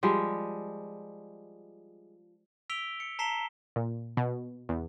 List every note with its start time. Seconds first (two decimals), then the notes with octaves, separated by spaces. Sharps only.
0.03 F3 G3 G#3
2.70 E6 B6 D7 F7 G7
3.00 C#7
3.19 A5 A#5 B6 C7 E7 G7
3.76 A#2
4.17 B2
4.69 E2